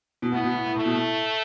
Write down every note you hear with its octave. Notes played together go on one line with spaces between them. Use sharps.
B2
A2 B3
B2
A2
A2
A2 A3
B2
A2